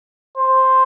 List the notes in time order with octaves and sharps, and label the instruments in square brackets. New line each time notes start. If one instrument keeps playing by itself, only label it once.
[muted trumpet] C5